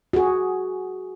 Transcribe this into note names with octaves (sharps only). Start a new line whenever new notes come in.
F#4 G#4